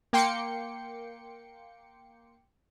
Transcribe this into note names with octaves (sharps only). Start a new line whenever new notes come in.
A#3 G5 C6 D6 C#7